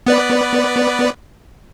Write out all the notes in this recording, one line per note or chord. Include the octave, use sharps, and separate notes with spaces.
B3 B4 D5